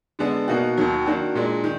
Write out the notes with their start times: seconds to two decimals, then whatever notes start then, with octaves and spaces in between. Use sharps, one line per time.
0.19 D3 G#3 B3 D4
0.48 B2 A#3 D#4 F#4
0.77 D#2 D#3 F#3
1.06 D#3 A#3 D4 F#4
1.35 A#2 G#3 D4
1.64 D#3